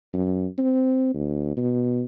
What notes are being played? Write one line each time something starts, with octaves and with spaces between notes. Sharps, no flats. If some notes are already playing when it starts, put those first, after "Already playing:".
F#2
C4
D2
B2